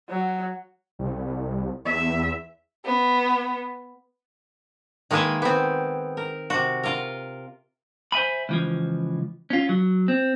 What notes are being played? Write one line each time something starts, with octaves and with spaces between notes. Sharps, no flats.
F#3
C2
E2 E5
B3
D#3 G#3 A#3 B4 D#5 E5
B3 C4
A#4
C3 F#4
F4 A#4
C5 E5 G#5 B5
C#2 E3 F3
C#4 F4
F#3
C4